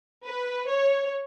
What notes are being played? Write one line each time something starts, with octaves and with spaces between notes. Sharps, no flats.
B4
C#5